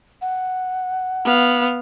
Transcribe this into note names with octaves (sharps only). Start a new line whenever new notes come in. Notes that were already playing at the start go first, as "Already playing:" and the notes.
F#5
B3 F5